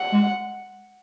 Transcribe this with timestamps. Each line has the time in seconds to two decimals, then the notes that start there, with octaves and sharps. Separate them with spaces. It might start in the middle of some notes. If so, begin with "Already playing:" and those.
Already playing: F#5
0.12 G#3